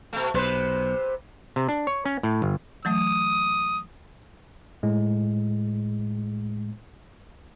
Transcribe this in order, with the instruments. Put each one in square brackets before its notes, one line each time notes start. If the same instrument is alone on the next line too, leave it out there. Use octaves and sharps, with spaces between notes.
[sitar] B2 A3
[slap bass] B1 [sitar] C3 B4 C5
[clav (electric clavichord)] C3
D4
C#5
C#4
A2
G1
[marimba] E3 F#3 A3 [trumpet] D#6
[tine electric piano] A2 G#3